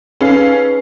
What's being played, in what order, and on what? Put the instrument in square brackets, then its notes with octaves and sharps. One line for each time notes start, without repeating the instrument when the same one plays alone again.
[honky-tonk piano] C#4 A4 F5 [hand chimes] D#4 G#4 B4